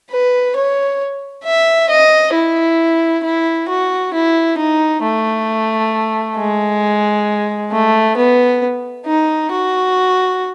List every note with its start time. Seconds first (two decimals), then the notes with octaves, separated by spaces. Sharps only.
0.10 B4
0.56 C#5
1.44 E5
1.89 D#5
2.34 E4
3.24 E4
3.68 F#4
4.14 E4
4.58 D#4
5.03 A3
6.37 G#3
7.71 A3
8.17 B3
9.06 D#4
9.51 F#4